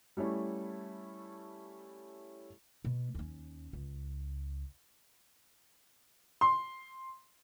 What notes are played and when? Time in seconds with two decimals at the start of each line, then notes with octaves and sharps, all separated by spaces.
0.17 G3 A3 C#4 E4
2.85 B2
3.15 D#2 C#4
3.73 C#2
6.41 C6